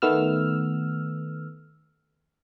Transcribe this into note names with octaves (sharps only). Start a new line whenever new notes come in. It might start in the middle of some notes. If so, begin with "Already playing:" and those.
D#3 A3 B3 E6 F6